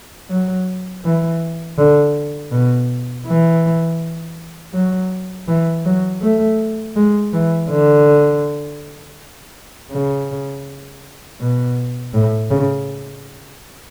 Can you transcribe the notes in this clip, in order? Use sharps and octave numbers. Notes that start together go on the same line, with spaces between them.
F#3
E3
D3
B2
E3
F#3
E3
F#3
A3
G#3
E3
D3
C#3
B2
A2
C#3